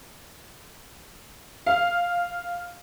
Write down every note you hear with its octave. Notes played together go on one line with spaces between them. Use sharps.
F5